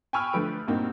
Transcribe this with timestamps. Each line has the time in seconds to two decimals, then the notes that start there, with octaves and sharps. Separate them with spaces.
0.13 G5 G#5 B5 C#6 E6 F6
0.33 D3 F3 A3 B4 D7
0.68 G2 A#2 A#3 C4 D#4 F#4